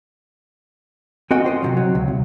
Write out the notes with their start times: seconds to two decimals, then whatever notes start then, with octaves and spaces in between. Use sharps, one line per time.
1.31 C4 F#4 A#4 D#5 G5 G#5
1.45 F4 C5 D#5
1.62 C3 D#3 F#3
1.77 F#3
1.95 C#2
2.08 C2